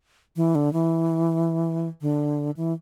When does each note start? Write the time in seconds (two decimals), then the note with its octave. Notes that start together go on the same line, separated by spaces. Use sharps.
0.36 E3
0.55 D3
0.73 E3
2.01 D3
2.56 E3